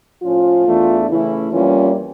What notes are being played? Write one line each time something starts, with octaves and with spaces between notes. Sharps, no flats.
A2 F3 C#4 F4
E2 E3 A3 D4
C#3 E3 A3 C#4 E4
F2 E3 G3 A#3 C#4 F4